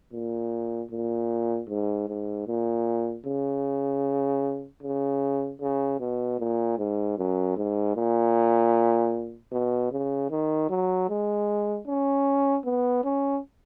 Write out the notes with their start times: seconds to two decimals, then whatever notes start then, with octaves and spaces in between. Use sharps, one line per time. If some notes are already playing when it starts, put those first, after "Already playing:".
0.12 A#2
0.91 A#2
1.69 G#2
2.08 G#2
2.47 A#2
3.26 C#3
4.83 C#3
5.61 C#3
6.00 B2
6.39 A#2
6.78 G#2
7.18 F#2
7.57 G#2
7.96 A#2
9.52 B2
9.91 C#3
10.30 D#3
10.69 F#3
11.09 G#3
11.87 C#4
12.65 B3
13.04 C#4